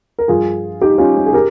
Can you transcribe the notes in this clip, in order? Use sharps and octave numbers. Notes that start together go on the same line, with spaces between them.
A#4
G2 F3 F4 G#4
D#4 G4
C#4 F4
C#4
G#4
G4 A#4